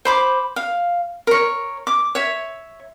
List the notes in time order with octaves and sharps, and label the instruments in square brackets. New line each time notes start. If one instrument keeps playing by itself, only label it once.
[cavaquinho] C5 B5 D6
F5
A#4 C#5
D6
C#5 E5